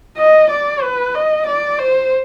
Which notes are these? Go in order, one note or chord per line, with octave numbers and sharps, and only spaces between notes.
D#5
D5
B4
D#5
D5
C5